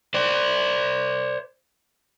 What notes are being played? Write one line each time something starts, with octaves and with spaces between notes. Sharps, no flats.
C5 D5